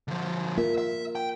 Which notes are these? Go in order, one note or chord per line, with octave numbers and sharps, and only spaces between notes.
D3 F3
A#3 F4 A#4 E5
E5
G5